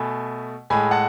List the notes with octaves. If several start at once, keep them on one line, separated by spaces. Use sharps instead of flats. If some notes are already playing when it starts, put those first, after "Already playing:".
Already playing: B2 A3 G#5 B5
A2 G#3 G#5 B5
F#5 A5